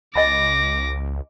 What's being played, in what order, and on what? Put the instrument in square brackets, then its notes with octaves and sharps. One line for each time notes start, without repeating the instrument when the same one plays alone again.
[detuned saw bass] C#2 [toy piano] D#5 G#5 B5 [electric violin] D6 A#6